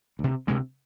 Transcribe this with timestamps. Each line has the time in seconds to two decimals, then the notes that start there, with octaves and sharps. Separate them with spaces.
0.19 D2 C3
0.47 D2 C3 G#3